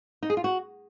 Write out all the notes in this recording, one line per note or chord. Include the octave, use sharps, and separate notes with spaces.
D#4
G#4
F4
F#4